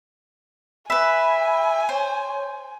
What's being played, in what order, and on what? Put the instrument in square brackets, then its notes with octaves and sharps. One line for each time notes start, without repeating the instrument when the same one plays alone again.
[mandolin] B4 E5 [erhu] G#5 [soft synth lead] B5
[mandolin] C5 [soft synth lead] C#5